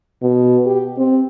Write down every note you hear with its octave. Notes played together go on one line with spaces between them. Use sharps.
B2
G4
C4